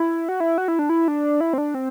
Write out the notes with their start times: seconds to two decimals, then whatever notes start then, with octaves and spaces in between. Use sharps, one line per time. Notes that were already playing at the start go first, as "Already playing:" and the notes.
Already playing: E4
0.29 F#4
0.40 E4
0.58 F#4
0.68 E4
0.79 D4
0.89 E4
1.08 D4
1.40 E4
1.53 C4
1.58 D4
1.74 C4